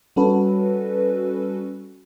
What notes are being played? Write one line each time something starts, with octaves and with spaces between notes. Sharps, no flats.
G3 C#4 F#4 A4 B4